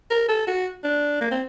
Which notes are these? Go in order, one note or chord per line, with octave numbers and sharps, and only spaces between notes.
A#4
A4
F#4
D4
A#3
C4